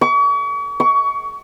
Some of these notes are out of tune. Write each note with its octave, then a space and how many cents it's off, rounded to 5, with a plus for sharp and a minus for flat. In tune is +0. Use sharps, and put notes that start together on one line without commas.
C#6 +40
C#6 +25